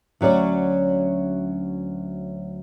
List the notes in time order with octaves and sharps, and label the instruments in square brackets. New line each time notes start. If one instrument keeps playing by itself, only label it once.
[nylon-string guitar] D2 F#3 C#4 D5